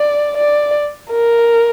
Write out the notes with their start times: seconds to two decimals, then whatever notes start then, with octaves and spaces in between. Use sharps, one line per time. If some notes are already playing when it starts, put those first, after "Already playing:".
Already playing: D5
0.37 D5
1.11 A#4